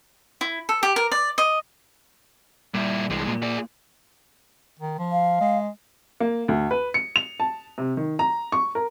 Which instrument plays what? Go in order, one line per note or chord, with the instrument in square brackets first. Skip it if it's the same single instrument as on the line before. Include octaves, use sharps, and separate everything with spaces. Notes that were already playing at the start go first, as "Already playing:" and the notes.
[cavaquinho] E4
A4
G4
A#4
D5
D#5
[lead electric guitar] A#2 E4 [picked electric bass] G3
[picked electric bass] C2 E3 [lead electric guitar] G2 G#3
[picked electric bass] A#2 A#3
[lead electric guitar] G#4 D5
[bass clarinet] D#3
F3
[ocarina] F5
[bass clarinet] G#3
[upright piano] A#3
D2
B4
C#7
F7
A5
C3
D#3
A#5
C#6
A#4